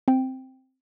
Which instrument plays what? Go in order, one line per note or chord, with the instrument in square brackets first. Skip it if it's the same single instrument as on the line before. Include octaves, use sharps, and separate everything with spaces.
[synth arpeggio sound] C4 G5